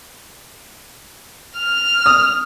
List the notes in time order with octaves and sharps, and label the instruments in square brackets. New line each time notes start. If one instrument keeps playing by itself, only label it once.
[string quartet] F6
[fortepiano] D#6